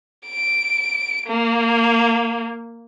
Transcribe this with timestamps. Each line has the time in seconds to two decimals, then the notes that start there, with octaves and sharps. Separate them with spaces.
0.29 D7
1.26 A#3